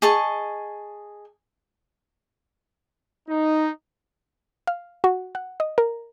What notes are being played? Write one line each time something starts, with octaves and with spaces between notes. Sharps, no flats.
G#4 D#5 A5 C#6
D#4
F5
F#4
F#5
D#5
A#4